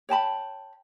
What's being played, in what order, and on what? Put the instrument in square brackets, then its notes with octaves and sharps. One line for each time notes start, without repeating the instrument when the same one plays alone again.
[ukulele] C#5 G5 A5 B5